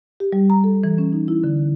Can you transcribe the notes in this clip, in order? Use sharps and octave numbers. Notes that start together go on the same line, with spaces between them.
G4
G3
A#5
A4
E3
C#4
D#4
E4
D3